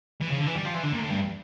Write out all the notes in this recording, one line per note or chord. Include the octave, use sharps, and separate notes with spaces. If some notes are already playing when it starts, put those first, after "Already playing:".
E3
C#3
D3
E3
G3
F3
E3
D3
A#2
A2
G2